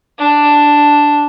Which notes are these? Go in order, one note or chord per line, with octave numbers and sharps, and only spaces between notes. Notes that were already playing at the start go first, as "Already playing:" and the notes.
D4